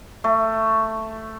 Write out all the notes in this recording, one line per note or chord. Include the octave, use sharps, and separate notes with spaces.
A3